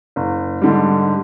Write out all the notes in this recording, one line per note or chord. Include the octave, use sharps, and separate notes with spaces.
F#1
G#2 D3 G3